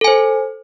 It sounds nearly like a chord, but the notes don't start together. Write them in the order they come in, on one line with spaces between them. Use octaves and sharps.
A4 G#5 C5